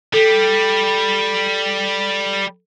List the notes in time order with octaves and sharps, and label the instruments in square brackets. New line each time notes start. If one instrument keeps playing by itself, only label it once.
[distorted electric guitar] G3 [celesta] A4